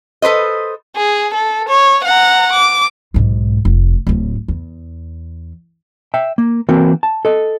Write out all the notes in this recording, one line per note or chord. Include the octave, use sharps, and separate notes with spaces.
A4 B4 C5 D#5
G#4
A4
C#5
F#5 A#5
D6
B1 G#2
F1
D1 A2
E2
E5 G5
A#3
E3 A#3 C4 F#4 A#4
A5
A4 D#5